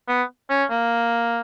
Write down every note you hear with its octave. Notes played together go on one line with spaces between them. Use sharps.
B3
C#4
A#3